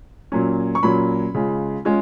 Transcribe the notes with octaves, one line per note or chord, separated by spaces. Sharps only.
A#2 F#3 C#4
C#6
A#2 F#3 C#4 B5
C#3 G#3 C#4 F4
G#3 C#4 F4